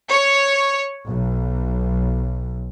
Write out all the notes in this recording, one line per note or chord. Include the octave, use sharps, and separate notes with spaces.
C#5
B1